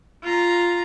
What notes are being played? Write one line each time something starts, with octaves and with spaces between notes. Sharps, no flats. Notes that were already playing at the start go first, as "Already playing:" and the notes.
F4 A#5